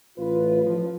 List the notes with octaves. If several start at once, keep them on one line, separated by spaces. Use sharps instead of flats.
A1 F4 B4
F3